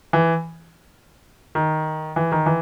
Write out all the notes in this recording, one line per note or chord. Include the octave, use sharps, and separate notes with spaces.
E3
D#3
E3
D#3
E3